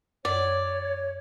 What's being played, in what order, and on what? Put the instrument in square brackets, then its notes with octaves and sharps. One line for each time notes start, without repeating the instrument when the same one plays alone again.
[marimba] F#2 [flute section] C#5 [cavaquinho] D5